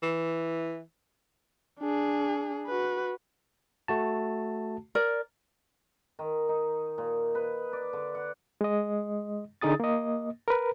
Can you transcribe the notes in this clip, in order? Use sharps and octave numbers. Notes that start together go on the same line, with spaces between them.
E3
D4 G#4
F#4 B4
A3 F#4 A5
A#4 D5
D#3
D#4
A#2
B4
D5
D3
F#5
G#3 D#5
D3 D#4 G#4 D#6 A6
A#3 D#5
A#4 B4